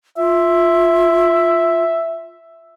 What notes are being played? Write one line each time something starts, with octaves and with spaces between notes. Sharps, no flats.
F4 E5